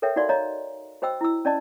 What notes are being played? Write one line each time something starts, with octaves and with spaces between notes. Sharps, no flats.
A4 A#4 C#5 E5 G5
D#4 F#4 A#4 D5 F5 C6
C#5 D#5 F5 A#5
F#4 C5 D#5 G5 E6
E4 E6
C#4 D5 D#5 A5